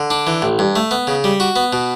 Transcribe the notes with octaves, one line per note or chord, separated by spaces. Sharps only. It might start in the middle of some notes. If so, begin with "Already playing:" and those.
Already playing: D3
D4
E3
A1
G2
A3
B3
C#3
G3
F#4
B3
B2